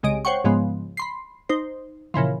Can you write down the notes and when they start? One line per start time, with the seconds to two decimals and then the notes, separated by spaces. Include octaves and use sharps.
0.03 C2 C#3 G#3 D#5 D7
0.25 C5 C#5 F#5 G5 C#6
0.44 G#2 C#3 F3 G#3 B3
0.97 B5 C6 C7
1.49 D#4 C5
2.14 A#2 C#3 E3 F3